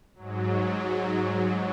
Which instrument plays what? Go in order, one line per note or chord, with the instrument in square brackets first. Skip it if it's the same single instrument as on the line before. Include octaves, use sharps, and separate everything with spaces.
[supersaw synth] G#2 F#3